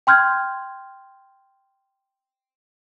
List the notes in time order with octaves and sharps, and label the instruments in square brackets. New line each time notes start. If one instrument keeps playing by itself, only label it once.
[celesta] G5 C6 F6 G6 G#6